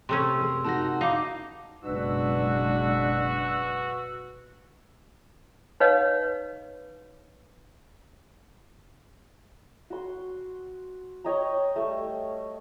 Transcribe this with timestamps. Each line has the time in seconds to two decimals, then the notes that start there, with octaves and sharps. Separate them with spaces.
0.09 C3 A3 C#4 C6 E6
0.41 G#4 A#4
0.65 D#4 F#4 A#4 A5 A#6
1.01 D#4 E4 E5 F5 D6
1.84 F#1 B2 G#3 D4 F#4 B4 E6
5.80 D#4 B4 C#5 D#5 F5
9.90 F#4 C6
11.24 C#5 D#5 G5 A#5
11.76 G3 A3